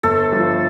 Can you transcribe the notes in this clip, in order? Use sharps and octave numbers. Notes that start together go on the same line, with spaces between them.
G1 A4
G2 F3